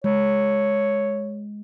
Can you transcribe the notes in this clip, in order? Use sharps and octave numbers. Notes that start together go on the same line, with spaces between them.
G#3 C#5